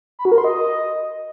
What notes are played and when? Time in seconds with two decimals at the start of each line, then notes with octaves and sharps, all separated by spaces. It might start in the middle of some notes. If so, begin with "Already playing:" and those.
0.19 B5
0.25 F#4
0.32 A#4
0.38 C6
0.44 D#5